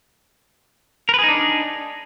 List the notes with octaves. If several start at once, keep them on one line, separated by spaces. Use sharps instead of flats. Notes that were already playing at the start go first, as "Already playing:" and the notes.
D4 D#4 G#4 A#4 B4